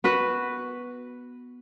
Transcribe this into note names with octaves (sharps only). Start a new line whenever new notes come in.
B3 F#4 B4 F#5